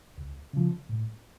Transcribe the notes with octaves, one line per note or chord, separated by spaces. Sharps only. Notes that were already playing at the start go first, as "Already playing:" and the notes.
C#2
C#3 F3
A2